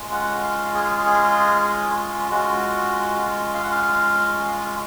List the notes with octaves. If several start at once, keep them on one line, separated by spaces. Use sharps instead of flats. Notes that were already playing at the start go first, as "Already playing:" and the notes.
Already playing: G#3 C#4 F4
F#5
F5
G#4
G#4
G#3 C#4 F4 F#4
F5
F#5
F5